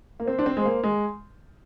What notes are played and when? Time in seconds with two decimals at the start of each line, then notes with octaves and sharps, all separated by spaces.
0.20 A#3
0.28 C4 C5
0.39 D4
0.46 C4
0.57 G#3
0.66 A#3
0.83 G#3